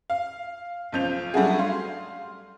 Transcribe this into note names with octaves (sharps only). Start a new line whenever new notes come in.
F5
B1 C#3 F3 G6 F7
F#3 G3 A3 D4 F#4 G#4
F5 C6